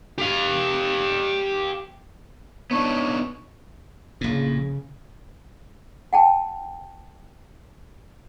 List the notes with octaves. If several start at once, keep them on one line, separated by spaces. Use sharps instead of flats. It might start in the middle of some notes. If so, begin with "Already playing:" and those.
G4 F5
B3 D4 D#4 C#5
A#1 A2 C#3
F#5 G5 A5